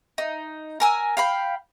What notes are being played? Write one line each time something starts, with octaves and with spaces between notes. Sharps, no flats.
D#4
A#4 G#5 E6
F5 G5 B5